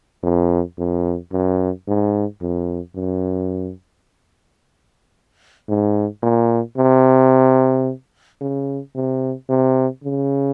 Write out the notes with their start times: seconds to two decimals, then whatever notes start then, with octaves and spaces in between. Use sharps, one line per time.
0.23 F2
0.78 F2
1.32 F#2
1.87 G#2
2.41 F2
2.95 F#2
5.68 G#2
6.22 A#2
6.77 C3
8.41 C#3
8.95 C3
9.49 C3
10.04 C#3